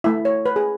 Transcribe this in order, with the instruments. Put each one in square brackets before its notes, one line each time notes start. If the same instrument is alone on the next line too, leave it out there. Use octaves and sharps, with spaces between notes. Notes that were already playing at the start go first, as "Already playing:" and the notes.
[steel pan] A3 E4 E5
C#5
B4
G#4